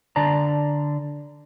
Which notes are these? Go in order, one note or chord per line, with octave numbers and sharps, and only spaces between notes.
D3 D5 A5 A#5